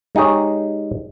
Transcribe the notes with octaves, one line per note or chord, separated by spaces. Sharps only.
G#3 D#4 G4 G#4 C#5